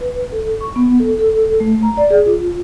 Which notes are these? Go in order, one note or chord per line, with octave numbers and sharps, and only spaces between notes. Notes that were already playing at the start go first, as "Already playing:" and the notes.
B4
A4
C#6
B3
A4
A4
A3
A#5
D5
G#4
F4